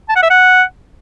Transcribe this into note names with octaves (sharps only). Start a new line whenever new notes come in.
A5
F#5
E5
F#5